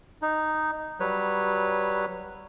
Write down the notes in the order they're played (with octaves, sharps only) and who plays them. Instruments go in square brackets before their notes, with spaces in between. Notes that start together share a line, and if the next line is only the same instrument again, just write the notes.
[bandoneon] D#4
F#3 G3 B4 C#5